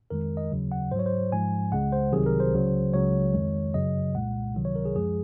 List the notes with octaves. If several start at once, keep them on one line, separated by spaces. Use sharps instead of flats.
F2 D#3 G#3 A#4
D#5
D#2 C#3 F#3
F#5
G#2 F#3 C5 C#5
C5
G#2 F3 G#3 G#5
C#2 C#3 G#3 F#5
C5
C2 C3 D#3 F#3 G#4
A#4
C5
C#2 C#3 F#3
C#2 C#3 F#3 C#5
F2 D#3 G#3
F#2 C#3 F#3 D#5
C2 A#2 G#3 F#5
C#2 C3 D#3 F#3
C#5
A#4
G#4
F#2 F3 G#3 G#4